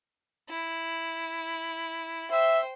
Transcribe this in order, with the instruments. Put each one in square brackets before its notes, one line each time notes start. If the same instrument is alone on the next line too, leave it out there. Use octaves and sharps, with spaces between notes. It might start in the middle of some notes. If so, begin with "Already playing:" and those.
[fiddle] E4
[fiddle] C5 G5 [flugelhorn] E5